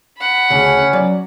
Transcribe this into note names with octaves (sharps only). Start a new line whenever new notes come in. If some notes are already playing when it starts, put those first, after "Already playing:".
F#5 B5
D2 C#3 C#4
F#3 D5